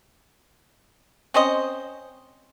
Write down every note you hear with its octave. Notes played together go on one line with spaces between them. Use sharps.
C4 C#4 C5 D#5